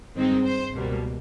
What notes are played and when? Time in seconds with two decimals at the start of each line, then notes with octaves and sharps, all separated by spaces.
0.15 G2 D#3 G#3 C4 D#4
0.43 C5
0.72 C#2 B2 G3 A#3